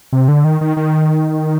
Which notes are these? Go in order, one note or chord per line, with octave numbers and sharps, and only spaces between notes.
C3
D3
D#3
D#3
D#3